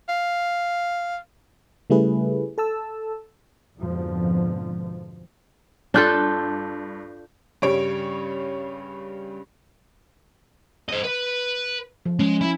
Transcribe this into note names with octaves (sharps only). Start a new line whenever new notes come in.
F5
C#3 G3 A3 E4 G#4 B4
A4 A5 E6
F2 G#2 B2 D3 F3
G2 D4 F4 A4 F#6 G6
G2 C#3 G3 C#5 D7
C5 D#5
B4
F3
G#3 C#4
E4